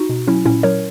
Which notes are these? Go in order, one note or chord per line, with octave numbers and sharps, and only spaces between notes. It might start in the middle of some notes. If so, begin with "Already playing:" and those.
Already playing: D#4 F#4
B2
F#3 C#4 E4
A#2 C#4 E4
F#3 A#4 C#5